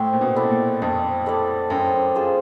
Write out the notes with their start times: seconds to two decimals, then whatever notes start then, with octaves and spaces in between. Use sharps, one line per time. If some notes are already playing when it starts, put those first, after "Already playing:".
Already playing: A2 C4
0.13 A#2
0.21 B2
0.36 E4 A4 D5
0.51 A#2
0.82 F2 C4
1.26 E4 A4 D5
1.70 F#2 C4
2.15 F4 G#4 C5